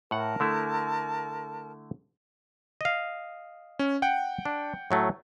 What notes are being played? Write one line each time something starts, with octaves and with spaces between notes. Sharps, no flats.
A2 A#4 F#5 A5
D3 A3 E4
D#5 F5
C#4
F#5 G5
D4
A2 F#3 A3